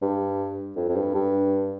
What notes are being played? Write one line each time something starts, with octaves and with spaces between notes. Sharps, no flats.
G2
F2
F2
G2
G2